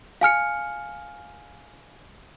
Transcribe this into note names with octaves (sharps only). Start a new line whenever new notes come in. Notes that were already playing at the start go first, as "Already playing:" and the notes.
F5 G#5 F6 C#7